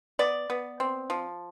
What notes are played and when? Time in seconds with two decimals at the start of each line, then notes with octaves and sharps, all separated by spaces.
0.19 B3 D5
0.50 B3
0.80 C4
1.10 F3